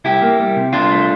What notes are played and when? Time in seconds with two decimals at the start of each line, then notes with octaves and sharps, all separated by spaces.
0.04 C2 E4 G4
0.22 A#3
0.40 G3
0.57 C3
0.73 C2 D4 F4
0.91 A3